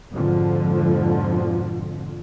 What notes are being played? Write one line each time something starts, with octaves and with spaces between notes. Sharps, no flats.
F2 G#2 B2 D3 F3